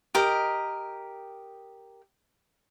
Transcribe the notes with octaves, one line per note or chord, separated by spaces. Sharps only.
G4 A#4 D#5